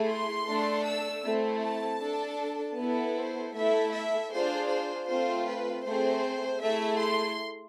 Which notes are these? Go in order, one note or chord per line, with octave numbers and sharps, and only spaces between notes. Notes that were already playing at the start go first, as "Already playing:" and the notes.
Already playing: A3 E4 G#4
C6
A3 D4 A4
E6
A3 C4 E4
A5
D4 A4
B3 E4 A4
C5
A3 E4 A4 E5
E5
D4 F4 G#4 C5
C5
A3 C4 F4 C5
B4
A3 C4 G#4 C5
A3 E4 G#4 E5
C6